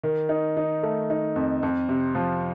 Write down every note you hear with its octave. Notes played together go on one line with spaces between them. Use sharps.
D#3
D#4
D#4
A3
D#4
F2
F2
C3
F3